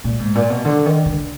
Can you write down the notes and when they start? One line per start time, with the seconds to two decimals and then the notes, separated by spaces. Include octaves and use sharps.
0.04 A#2
0.19 G#2
0.35 A#2
0.50 B2
0.65 D3
0.86 D#3
1.06 D3